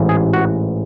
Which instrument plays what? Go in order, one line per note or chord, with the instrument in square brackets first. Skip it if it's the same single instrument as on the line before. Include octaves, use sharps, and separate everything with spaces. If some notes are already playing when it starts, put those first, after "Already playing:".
Already playing: [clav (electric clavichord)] A1 G#2 E3
G#4
F#4